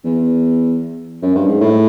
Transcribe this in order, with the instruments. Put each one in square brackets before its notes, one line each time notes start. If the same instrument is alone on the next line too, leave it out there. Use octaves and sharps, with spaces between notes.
[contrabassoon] E2
F#2
G2
G#2
A2